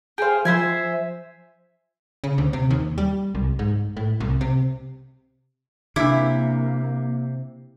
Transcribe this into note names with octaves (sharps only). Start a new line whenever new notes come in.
G#4 C5 F5 G5
F3 C5 E5 G#5
C#3
D2
C3
D#2
G3
C2
G#2
A2
C2
C3
C3 A#3 D4 E4 D6